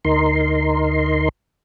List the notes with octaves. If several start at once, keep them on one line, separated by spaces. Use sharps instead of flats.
D2 D#4 A#4 C6